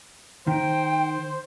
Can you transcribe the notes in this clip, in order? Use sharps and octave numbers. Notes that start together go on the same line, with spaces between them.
D#3 C5 G5